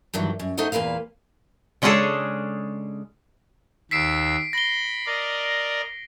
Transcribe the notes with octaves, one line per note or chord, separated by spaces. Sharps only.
G2 D#3 E3 F#3
F#2
A3 D#4 A4 C5 D#5 F#5
E2 A#2 A#3 B4 F5
C#3 G#3 C#4 D4 G#4 A4
D#2 E6 B6 C7 D7
B5 A#6 G7
A#4 D5 D#5